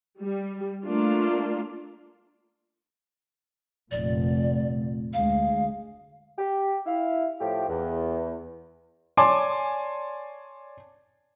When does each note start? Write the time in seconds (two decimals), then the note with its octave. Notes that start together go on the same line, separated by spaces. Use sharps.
0.21 G3
0.84 A3 A#3 D4 F4
3.91 F1 A#2 D5
5.13 D2 G#3 F5
6.38 G4
6.86 E4 F5
7.41 A2 F3 A3 G4
7.69 E2
9.17 C#5 D5 G#5 A5 C6 D6